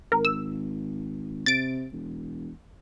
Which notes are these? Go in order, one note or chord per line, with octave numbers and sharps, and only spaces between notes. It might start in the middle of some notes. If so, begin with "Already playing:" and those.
G#1 A#4
E6
C3 A6 D7
E1